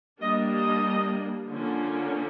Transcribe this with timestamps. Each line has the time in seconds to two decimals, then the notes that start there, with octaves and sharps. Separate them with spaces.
0.21 G3 A#3 D4 D#5
0.53 D#5
1.48 D3 F3 A#3 C#4